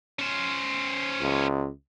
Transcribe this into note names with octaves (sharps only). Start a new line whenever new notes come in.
C#4 C5
C#2